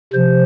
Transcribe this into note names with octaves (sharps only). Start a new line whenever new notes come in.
C3 F3 C5